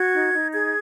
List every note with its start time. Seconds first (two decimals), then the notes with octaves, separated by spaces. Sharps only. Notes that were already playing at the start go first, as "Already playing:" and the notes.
Already playing: F#4 G#6
0.13 D#4
0.33 D#4
0.53 G#4 G#6